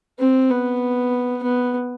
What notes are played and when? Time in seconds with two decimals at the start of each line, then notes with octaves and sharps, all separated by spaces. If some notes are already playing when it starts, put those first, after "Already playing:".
0.19 C4
0.50 B3
1.43 B3